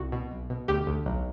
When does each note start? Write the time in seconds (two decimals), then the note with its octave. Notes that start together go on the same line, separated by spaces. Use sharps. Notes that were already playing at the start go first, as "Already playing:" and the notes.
Already playing: C2 F#4
0.12 B2
0.31 B1
0.50 B2
0.68 D2 G4
0.87 D2
1.06 B1